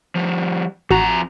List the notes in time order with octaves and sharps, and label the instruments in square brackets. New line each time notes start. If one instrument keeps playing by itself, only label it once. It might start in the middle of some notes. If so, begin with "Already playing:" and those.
[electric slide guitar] F3 G3
[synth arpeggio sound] A1 F#4 [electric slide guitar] F2 A#5